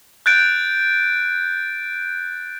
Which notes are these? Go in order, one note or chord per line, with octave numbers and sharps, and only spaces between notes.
F#6 G6 A6 D7